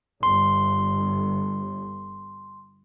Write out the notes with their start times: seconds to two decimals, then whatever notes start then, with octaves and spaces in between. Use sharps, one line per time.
0.23 G1 C6